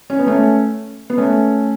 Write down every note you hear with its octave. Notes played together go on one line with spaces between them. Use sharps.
C#4
B3
A3 C#4
B3
A3 C#4